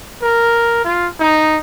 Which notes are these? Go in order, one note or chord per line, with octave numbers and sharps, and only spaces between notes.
A#4
F4
D#4